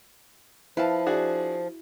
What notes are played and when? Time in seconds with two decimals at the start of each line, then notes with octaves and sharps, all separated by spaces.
0.77 F3 E4 B4 F5 A5
1.06 D4 F#4 G#4